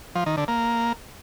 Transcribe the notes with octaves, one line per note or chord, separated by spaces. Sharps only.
F3
D#3
D3
A#3